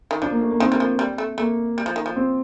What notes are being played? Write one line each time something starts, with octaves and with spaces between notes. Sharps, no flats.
D#3
F3 D4
A#3
A3
A#3
D#3 C4
G3
F3
G3
A3
A3 A#3
G3
F3
D#3
F3
C4